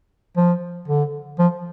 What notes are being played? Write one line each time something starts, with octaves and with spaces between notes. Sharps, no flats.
F3
D3
F3